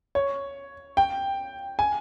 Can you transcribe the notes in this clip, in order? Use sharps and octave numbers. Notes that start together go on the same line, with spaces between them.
C#5
G5
G#5